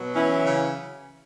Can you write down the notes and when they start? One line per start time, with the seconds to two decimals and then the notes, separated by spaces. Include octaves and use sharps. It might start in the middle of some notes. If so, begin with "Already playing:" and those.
Already playing: B2 F#3
0.15 E3 C#4 E4
0.45 C#3